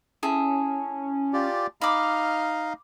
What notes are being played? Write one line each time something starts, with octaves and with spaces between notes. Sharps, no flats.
C#4 E4 G#4 A4
F4 G4 D5
D#4 D#5 F5 B5 D6 F6